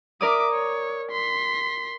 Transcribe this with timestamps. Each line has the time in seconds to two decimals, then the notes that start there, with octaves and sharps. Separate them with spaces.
0.21 A#4 D5 E5 D6 D#6
0.52 C#5
1.11 C6 B6